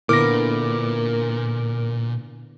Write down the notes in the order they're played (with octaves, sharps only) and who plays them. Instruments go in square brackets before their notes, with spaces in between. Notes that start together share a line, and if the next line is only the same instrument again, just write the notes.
[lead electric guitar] A#2 [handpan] D3 B3 E4 [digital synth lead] A#4 [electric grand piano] D6 A#6